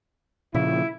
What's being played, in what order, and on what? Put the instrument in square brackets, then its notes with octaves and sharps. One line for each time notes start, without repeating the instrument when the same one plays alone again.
[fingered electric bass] A#2 C#3 F3 [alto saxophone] E4